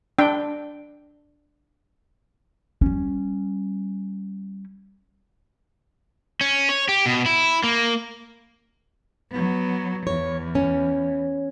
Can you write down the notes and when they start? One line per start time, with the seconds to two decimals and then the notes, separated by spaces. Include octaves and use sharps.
0.19 D4 G5
2.82 G3 C#4
6.41 C#4
6.69 C#5
6.89 G4
7.06 B2
7.26 E4
7.63 A#3
9.30 F#3 B3
10.07 E2 C#5
10.55 C#4